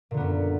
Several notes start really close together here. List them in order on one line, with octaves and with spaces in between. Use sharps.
A#2 D3 B3 F#2